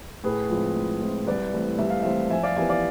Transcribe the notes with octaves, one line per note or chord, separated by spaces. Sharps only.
A2 G#4 B4
F3 G#3 C4
A2
F3 G#3 C4
C2 B4 D5
C3 E3 A3 C4
C2 E5
F5
C3 E3 A3 C4 C5 E5
F2 E5 G#5
D5 F5
C3 E3 B3 E5 G#5
D5 F5